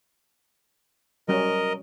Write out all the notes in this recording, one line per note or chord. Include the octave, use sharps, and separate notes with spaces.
F#3 G3 C#4 A#4 D#5